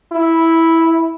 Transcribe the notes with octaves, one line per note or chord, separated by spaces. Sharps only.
E4